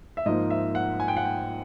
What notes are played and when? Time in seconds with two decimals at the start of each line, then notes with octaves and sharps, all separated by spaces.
0.17 E5
0.26 G#2 F3 A#3 D#4 D#5
0.50 E5
0.75 F#5
1.00 G#5
1.08 G5
1.17 F#5
1.25 G5